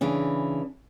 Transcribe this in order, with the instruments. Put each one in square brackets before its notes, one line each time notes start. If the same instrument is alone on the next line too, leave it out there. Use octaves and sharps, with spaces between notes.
[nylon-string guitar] C#3 E3 D4